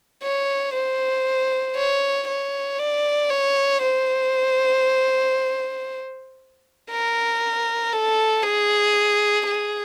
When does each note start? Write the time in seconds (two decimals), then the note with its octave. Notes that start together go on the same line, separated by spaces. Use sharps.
0.23 C#5
0.74 C5
1.76 C#5
2.28 C#5
2.79 D5
3.30 C#5
3.82 C5
6.90 A#4
7.93 A4
8.43 G#4
9.46 G#4